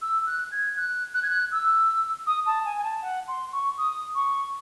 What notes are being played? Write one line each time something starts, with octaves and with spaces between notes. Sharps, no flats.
E6
F#6
G#6
F#6
F#6
G#6
F#6
E6
D#6
A5
G#5
G#5
A5
F#5
C6
C#6
D#6
C#6